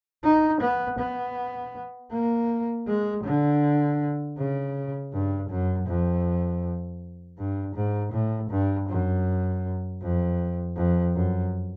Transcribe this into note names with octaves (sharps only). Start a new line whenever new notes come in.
D#4
B3
B3
A#3
G#3
D3
C#3
G2
F#2
F2
G2
G#2
A2
G2
F#2
F2
F2
F#2